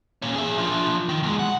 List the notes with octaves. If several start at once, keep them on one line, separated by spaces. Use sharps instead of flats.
A#2 C#4
G#4 E5
F3 D4
D#3
E2 G#3
F#5